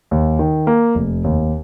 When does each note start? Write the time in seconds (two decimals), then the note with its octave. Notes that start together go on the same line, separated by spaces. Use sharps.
0.11 D#2
0.39 D#3
0.67 A#3
0.95 F1
1.24 D#2